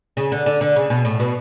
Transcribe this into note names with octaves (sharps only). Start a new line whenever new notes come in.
C#3
D3
D3
D3
C#3
B2
A2
B2